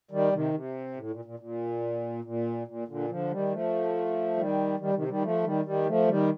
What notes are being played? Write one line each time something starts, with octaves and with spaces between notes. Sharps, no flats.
D#3 G3
C3 D#3
C3
A2
A#2
A#2
A#2
A#2
A#2
A#2 D3
D3 F3
D#3 G3
F3 A3
D#3 G3
D#3 G3
C3 D#3
D#3 G3
F3 A3
D#3 G3
D#3 G3
F3 A3
D#3 G3